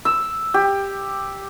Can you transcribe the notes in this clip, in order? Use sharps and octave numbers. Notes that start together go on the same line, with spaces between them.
E6
G4